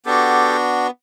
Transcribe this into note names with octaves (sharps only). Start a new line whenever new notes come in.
B3 D4 F#4 G4 A4